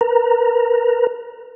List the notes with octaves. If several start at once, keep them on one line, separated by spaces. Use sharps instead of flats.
A#4 B4 A#5